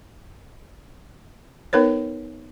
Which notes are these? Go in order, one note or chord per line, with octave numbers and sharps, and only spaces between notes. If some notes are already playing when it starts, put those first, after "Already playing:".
B3 D#4 A#4 B4 C#5